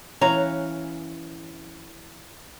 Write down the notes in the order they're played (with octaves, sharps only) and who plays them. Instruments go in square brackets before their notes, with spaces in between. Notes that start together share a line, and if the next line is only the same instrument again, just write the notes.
[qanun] E3 F5 F#5 [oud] C#4 [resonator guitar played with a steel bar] A#5